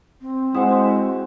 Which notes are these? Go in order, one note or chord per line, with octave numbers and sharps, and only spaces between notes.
C4
G#3 E4 F#4 C5 F#5 D#6